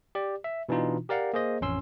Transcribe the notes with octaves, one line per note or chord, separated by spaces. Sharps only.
G4 D5
E5
B2 E3 D4 D#4 F4
G4 A#4 D5 F5 F#5
A#3 G#4 C5 D#5
A1 F2 C#4 C6 E6